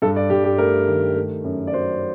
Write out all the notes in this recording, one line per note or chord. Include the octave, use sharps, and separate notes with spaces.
G2 A4
D5
G2 G4
G4
A3 A#4
D#3
A3
F#2
D5
F#3 C5